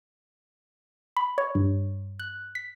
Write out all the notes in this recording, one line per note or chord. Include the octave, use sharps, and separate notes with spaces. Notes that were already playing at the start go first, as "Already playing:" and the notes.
B5
C#5
G2
F#6
B6